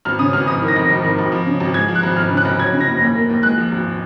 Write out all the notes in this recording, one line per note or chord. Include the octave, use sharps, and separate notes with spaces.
G#1 F6
C#3 D#6
G#1 F6
F1 D#6
D#3
A#6
F1
G#1
D#3
G#1
F3
C#3
G#1
G#3 G#6
F3
F#6
G#1
F1 F6
C#3
F#6
F1
F#3 G#6
C#3
A#6
F#1
D#2
A#3
D#2
G#3 F#6
F3
G#1